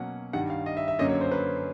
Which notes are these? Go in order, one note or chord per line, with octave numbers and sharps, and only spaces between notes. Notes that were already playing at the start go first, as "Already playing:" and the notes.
Already playing: B2 F#3 A#3 C#4 F#5
G2 D#3 G3 F#5
F5
D#5
E5
E5
F#2 D3 F#3 A#3 C#4 D#5
C#5
C5
B4